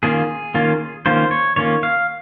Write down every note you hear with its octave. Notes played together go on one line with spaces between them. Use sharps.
D#3 A#3 C#4 F4 G#4
D#3 A#3 C#4 F4
D#3 A#3 C#4 F4 C5
C#5
D#3 A#3 C#4 F4 C#5
F5